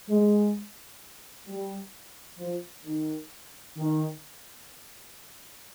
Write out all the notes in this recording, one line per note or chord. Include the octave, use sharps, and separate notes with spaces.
G#3
G3
F3
D#3
D#3